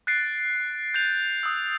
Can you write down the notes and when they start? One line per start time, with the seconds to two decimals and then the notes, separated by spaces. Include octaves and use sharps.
0.07 F#6 A6 C7 D7
0.94 G6 A6 F7
1.43 D#6 E6